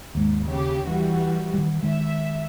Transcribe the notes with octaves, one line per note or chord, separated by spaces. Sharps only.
D#2 G#2
C#3 G4
E3 G3 F#4
D#3 G3
D#3 G#3 E5